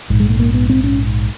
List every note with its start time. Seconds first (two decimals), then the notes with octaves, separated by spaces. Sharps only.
0.10 A#1 G#2
0.20 G#3
0.30 A3
0.40 A#3
0.54 B3
0.70 C4
0.84 C#4